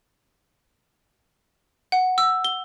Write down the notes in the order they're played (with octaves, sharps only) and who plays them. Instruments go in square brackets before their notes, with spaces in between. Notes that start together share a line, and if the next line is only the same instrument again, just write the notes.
[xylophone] F#5
E6
G7